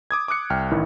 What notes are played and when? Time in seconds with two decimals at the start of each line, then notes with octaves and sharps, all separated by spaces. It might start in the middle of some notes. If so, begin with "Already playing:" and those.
0.11 D6 D#6 G#6
0.28 D6 D#6 F#6 C#7
0.50 C2 G5 F6
0.71 A1 D#3 E4